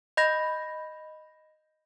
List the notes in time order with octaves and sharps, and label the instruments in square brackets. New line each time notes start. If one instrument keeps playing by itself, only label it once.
[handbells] D#5 B5 G6 A#6